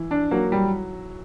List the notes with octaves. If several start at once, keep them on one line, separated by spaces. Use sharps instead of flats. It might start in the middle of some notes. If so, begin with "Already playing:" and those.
Already playing: E3 E4
D4
F#3 A#3 F#4
G3